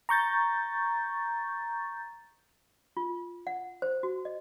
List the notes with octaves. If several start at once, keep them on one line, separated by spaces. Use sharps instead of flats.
A#5 C#6 G6 A6
F4
F#5
C5
F#4
D#5